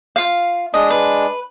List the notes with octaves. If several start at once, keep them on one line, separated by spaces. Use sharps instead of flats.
F4 F5
G#3 D4 D#5
B4